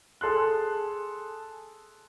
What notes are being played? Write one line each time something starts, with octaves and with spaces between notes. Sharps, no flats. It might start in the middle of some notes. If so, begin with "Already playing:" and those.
G#4 A4 C6 F#6